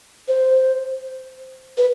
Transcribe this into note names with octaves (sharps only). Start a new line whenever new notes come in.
C5
B4